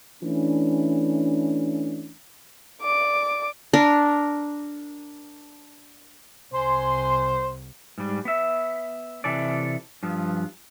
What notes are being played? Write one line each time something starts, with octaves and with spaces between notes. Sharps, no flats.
E3 A3 C#4 D4
D5 D6
D4 A#4
C2 C5 G#5 C6
G#2 G3
B3 E5
C3 E3 A4 D5
G2 F3 B3